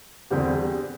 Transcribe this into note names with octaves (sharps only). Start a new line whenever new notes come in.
E2 D3 G3 C4 G4